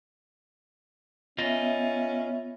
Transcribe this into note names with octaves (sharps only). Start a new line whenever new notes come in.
B3 C#4 F4 D#5 E5